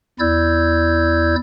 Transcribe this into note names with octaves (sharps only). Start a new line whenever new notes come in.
E2 E4 D5 E6 G6 G#6